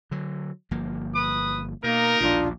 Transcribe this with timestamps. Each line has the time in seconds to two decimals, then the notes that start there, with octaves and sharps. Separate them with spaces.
0.11 D3 F#3
0.71 G1 F3 A#3
1.14 B4 D#6
1.84 B2 A#3 D#4 A#4
2.21 A#1 D#2 B2 D4 F4